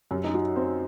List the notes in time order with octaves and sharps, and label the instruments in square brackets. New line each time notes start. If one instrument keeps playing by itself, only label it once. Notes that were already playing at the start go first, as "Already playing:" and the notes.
[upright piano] F#2 [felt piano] G4
[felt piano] D#4
F#4
[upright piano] C4